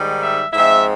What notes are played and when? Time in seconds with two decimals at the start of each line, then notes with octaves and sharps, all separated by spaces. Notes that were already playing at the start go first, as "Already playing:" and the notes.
Already playing: G#2 D#3 G3
0.21 E5
0.53 G#2 F3 G#3 C4 E5